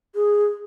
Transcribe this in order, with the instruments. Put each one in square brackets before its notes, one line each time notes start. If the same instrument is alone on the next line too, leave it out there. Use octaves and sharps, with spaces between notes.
[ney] G#4